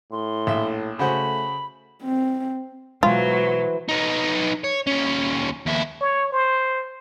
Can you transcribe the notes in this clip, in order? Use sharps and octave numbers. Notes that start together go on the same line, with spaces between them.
A2 C6
A#1 E5
C#3 A3 F#4 C5 B5
C4
B2 E3 F#3 G#3 F4 C5
B3 D#4
C#5
D#2 C#4
D#2 E4
C#5
C5